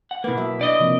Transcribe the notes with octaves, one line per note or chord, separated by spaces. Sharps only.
F#5
B2 A#3 E4 B4
F#3 F#4 E5
D4 D5 D#5
C3 F3 A#3